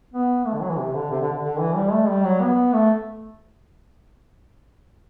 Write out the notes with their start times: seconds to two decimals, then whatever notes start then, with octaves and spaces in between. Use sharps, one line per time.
0.14 B3
0.46 A3
0.54 D3
0.62 F#3
0.70 E3
0.78 C3
0.95 D3
1.11 C3
1.21 D3
1.33 D3
1.43 D3
1.59 E3
1.76 G3
1.92 A3
2.08 G3
2.25 F#3
2.41 B3
2.73 A3